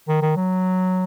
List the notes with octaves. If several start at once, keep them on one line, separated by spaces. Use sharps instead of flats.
D#3
D#3
F#3